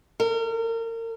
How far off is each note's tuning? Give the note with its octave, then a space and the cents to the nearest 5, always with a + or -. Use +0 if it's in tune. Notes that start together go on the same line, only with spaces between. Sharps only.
A#4 -35